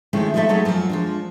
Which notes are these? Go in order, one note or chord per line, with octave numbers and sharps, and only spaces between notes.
D#3 F3 G#3 A3 C#4 E4
F3 A3 D#4 G#4 A4 E5
F#3 G#3 A3 D#4 A4
F#2 F3
F3 G#3 D4